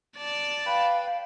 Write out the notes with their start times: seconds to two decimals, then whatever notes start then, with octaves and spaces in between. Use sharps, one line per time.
0.17 D5 A5
0.66 B4 F5 G5 B5